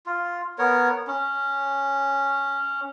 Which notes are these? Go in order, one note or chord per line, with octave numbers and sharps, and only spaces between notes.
F4
B3 A#4 C#5
C#4